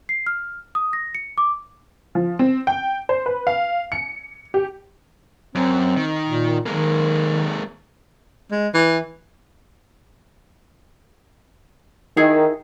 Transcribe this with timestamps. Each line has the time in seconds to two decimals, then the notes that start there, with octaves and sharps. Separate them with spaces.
0.09 C7
0.27 F6
0.75 D#6
0.93 A#6
1.15 C#7
1.38 D6
2.15 F3
2.39 C4
2.67 G5
3.09 C5
3.26 B4
3.47 F5
3.92 C#7
4.54 G4
5.55 F#2 C4
5.97 D#3
6.28 A#2
6.66 D#3 G#3 A#3
8.51 G#3
8.74 E3
12.17 D#3 D#4 E4 G#4